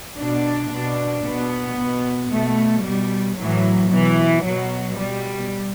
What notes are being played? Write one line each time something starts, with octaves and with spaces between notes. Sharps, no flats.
B2 D4
B2
B2 B3
B2
B2 A3
B2 G3
A2 E3 F#3
B2 E3
B2 F#3
B2 G3